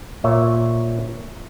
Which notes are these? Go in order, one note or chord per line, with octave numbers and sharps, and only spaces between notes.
A#2 C#5 E5